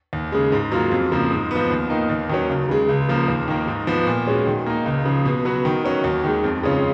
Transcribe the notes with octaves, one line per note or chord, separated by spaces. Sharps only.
D#2
C#3 G#3
G#2
F#3 A#3 F4
F2
C#3 F3 A#3
G#2
F3 B3
D#2
D#3 A#3 D#4
D#2
D#3 F#3 C#4
C#2
C#3 G#3
C#2
C#3 F3 A#3
D#2
D#3 A#3
G#2
F3 B3
A#2
G#3 C#4 F#4
D#3
A#3 D#4
C#2
C#3 F3
B2
F#3 B3 F#4
D#3
F#3 C#4 F#4
D#2
D#3 G#3
F2
C#3 G#3 C#4 F4